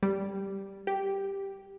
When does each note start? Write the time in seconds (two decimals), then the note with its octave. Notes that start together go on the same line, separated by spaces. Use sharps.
0.03 G3
0.87 G4